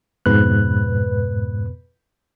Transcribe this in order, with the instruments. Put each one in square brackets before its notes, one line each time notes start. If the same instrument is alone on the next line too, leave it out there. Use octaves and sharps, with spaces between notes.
[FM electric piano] F2 B2 B4 [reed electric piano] G#2 F#6